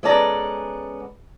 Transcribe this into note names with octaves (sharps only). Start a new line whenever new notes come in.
G#3 B3 C#4 A4 D5 A#5